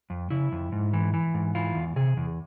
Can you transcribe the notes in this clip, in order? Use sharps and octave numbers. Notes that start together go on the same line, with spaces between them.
F2
C#3 E4
F2
G#2
E3
E3
G#2
E3 F4
E2
C3 G#4
E2